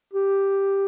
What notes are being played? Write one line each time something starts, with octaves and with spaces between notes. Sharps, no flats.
G4